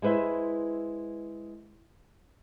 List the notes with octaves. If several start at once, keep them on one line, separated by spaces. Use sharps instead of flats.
G#3 E4 B4 C5 E5